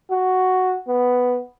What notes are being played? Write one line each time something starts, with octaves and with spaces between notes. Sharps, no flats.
F#4
B3